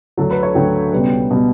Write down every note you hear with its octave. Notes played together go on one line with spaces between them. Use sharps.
D2 D3 F#3 A4
B4
C#5
D2 D3 F#3 G5
C#2 B2 G3 B3
B2 G3 B3